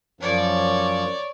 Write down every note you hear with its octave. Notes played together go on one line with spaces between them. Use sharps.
F#2 F3 C#5 D5